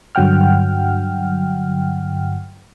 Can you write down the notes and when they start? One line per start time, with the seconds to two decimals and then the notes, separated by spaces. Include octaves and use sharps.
0.15 G2 D3 F#3 F#5 G5 F6